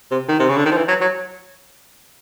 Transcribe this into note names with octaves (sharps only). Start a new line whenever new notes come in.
C3
D#3
C3
C#3
D3
D#3
F3
E3
F#3
F#3